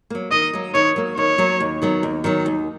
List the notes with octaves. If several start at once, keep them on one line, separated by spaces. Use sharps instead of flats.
F#3 A#3
D#3 D#5
F#3 A#3
D#3 C#5
F#3 A#3
D#3 C#5
F#3 A#3
D#2
D#3 F#3 B3
D#2
D#3 F#3 B3
D#2